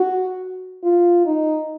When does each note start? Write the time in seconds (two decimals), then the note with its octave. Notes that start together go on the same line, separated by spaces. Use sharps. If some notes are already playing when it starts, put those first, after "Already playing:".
Already playing: F#4
0.83 F4
1.25 D#4